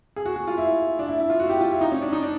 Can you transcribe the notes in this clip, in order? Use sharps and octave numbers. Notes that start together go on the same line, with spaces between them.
G#4
F#4
F#4
F4
E4
D4
E4
E4
F4
F#4
G4
F4
E4
D#4
C#4
D4
D#4
D4